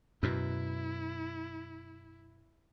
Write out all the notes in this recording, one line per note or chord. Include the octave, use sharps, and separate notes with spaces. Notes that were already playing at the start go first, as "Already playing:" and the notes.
F#2 B2 E4